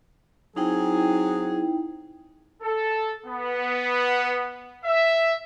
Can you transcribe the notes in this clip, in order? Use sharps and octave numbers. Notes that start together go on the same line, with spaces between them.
F#3 C4 D#4 E4 G#4 G5
A4
B3
E5